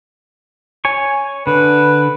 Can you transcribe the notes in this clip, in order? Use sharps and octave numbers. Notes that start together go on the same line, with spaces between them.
C#5 G#5 C#6
D3 B4